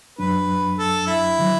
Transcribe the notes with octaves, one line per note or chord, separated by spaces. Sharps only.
F#2 F#3 D4 B4
A4
E4
D3 F#3